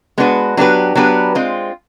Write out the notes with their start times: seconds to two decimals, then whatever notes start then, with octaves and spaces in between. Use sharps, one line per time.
0.18 G#3 B3 D4 F#4 B4
0.57 F#3 B3 D4 G4 B4
0.95 F#3 B3 D4 G4 B4
1.35 G#3 C4 F4